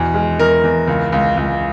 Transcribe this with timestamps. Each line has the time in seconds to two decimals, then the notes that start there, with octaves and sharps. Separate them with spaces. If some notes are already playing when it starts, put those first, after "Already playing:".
Already playing: E2 B2
0.14 G#3
0.39 E2 A#4
0.63 E2
0.88 C#2
1.12 C#2
1.37 C#2